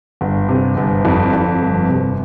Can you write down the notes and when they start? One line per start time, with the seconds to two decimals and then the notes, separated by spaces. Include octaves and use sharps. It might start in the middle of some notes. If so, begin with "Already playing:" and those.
0.21 G1
0.49 C3
0.77 G1
1.05 F2
1.33 F2
1.61 G1
1.89 C3